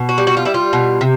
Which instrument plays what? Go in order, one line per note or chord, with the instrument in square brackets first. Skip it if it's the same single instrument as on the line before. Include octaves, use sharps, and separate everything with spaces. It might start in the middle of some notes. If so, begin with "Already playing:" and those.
Already playing: [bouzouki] B2
F#4
G3
F#4
F4
G3 E4
F4
B2
C3